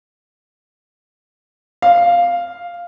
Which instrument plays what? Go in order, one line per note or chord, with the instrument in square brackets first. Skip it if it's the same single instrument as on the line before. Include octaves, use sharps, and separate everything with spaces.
[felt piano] F5